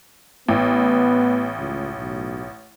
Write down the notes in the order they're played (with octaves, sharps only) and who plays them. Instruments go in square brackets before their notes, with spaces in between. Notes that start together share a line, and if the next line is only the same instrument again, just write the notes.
[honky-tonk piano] A1 [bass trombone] B3
[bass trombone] C#2
B1